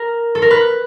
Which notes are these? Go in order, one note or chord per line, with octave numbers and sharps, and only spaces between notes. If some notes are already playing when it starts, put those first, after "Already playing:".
Already playing: A#4
A4
A#4
B4